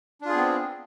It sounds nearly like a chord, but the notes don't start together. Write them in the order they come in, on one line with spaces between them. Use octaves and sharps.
D4 F4 G#4 B3 C4